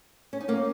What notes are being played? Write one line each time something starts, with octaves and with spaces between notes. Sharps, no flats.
C#4
D#4
A#3 C#4